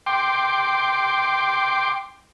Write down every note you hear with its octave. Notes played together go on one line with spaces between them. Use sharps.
G5 C6 D6